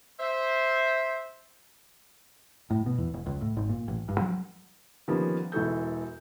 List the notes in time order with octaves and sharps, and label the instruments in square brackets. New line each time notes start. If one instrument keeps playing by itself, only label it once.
[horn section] C5 E5
[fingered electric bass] A2
B2
E2
E1
C#2
A2
G#1
A#2
A1
G2
F#3
[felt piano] D#3 F3 G3 A#3 B3 C#4
E1 E3 F#4 A4 G6